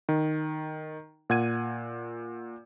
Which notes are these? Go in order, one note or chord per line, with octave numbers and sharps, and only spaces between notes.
D#3
A#2 F#5 G#6 D#7